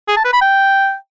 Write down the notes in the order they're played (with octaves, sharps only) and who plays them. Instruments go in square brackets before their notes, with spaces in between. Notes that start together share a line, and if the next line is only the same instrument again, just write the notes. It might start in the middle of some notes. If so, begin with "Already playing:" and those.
[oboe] G#4
A5
B4
B5
G5